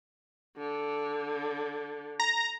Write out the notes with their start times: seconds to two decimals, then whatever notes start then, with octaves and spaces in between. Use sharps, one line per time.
0.57 D3
2.20 A#5